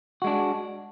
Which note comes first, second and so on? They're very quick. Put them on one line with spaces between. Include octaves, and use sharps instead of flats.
F#4 G#3 D4